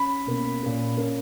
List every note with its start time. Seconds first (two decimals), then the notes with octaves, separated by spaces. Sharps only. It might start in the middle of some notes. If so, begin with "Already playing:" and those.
Already playing: C#4 B5
0.27 B2 A#3 C#4
0.63 A#2 A#3 C#4
0.97 A#2 A#3 C#4